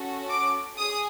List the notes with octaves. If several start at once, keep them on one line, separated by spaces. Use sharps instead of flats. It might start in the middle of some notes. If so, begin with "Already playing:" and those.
Already playing: C#4 F#4 A4
D6
G#4 D#6